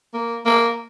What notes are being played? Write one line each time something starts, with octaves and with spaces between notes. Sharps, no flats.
A#3
A#3